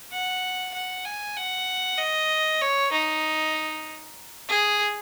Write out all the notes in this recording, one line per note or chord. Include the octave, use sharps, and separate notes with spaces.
F#5
F#5
G#5
F#5
D#5
C#5
D#4
G#4